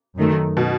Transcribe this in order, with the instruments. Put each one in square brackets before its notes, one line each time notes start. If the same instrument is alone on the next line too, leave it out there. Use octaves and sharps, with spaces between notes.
[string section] F#2 D#3 A3
[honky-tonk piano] B2